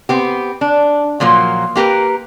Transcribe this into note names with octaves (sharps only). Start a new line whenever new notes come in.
B3 C4 G4
D4
A#2 F3 F#3 A#3
A#3 G4 A#4 B4